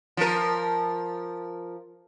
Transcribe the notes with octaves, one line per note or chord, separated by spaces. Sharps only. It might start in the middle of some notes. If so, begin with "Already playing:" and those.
F3 A#4